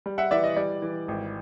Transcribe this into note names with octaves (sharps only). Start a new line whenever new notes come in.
G3
E5 F#5
E3 D5 E5
D#5
G3 D5
E3
G#1